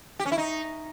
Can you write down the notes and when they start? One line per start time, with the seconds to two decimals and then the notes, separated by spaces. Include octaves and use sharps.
0.20 G4
0.26 C#4
0.32 E4
0.38 D#4